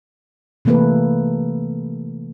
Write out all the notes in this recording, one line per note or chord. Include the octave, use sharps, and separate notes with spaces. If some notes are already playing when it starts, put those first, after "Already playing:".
C3 E3 A3 A#3 A4 B4